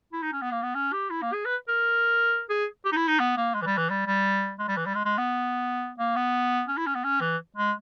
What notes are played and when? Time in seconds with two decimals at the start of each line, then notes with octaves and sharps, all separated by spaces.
0.13 E4
0.22 D#4
0.33 C#4
0.42 B3
0.51 A#3
0.63 B3
0.75 C#4
0.92 G4
1.10 E4
1.22 A#3
1.33 G#4
1.45 B4
1.68 A#4
2.49 G#4
2.85 G4
2.92 D#4
2.96 E4
3.07 D#4
3.19 B3
3.37 A#3
3.54 G#3
3.62 E3
3.66 G3
3.77 E3
3.90 G3
4.06 G3
4.59 G#3
4.68 G3
4.77 E3
4.86 G3
4.95 G#3
5.05 G#3
5.18 B3
5.99 A#3
6.16 B3
6.68 C#4
6.77 E4
6.87 C#4
6.95 B3
7.04 C#4
7.21 E3
7.56 G#3